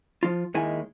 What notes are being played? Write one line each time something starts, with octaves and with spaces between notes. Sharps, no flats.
F3 F4
D#2 D#3 G#3 E4 G#5